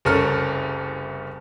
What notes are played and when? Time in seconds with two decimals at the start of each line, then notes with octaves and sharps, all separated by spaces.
0.05 F#1 C2 C#4 A4 A#4 F6